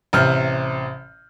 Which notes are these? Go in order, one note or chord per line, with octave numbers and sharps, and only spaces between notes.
A1 C3 F6 G6